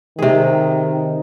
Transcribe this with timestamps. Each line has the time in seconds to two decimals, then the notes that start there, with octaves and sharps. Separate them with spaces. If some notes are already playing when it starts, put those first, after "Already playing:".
0.19 C3 D#3 G#4